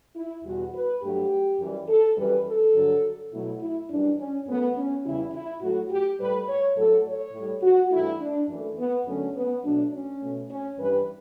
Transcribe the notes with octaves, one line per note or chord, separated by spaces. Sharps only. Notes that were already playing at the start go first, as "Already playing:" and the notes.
E4
E2 B2 G3 F#4
B4
G2 F#3 A3 G4
F#2 E3 G3
A4
F#2 E3 G3 B4
A4
G2 D3 F#3
B2 F#3 A3 E4
E4
F#2 E3 G3 D4
C#4
F#2 E3 A3 B3
C#4
E2 C#3 G3 E4
E4
A2 F#3 A3 F#4
G4
A2 G3 B4
C#5
A2 F#3 A3 A4
C#5
A2
G3
F#4
G2 E3 A3 E4
D4
F#2 E3 A3
B3
F#2 D3 F#3 A3 C#4
B3
B2 F#3 A3 D4
C#4
B2 A3
C#4
G2 E3 G3 B4